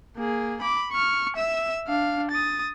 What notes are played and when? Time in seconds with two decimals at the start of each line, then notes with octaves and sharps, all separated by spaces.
0.16 A#3 G#4
0.62 B5 D6
0.92 C#6 F6
1.36 E5 E6
1.88 D4 F5
2.31 D#6 A6